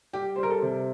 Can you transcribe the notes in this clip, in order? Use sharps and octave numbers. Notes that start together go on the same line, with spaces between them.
G3 G4
G3 C5
A#4
A4
C3